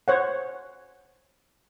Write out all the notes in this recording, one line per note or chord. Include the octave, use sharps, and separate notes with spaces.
C5 C#5 F#5